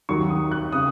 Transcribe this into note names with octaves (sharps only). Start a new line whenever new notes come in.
D#2 D#3 F#3 C#6
D#6
F#6
C#3 D#6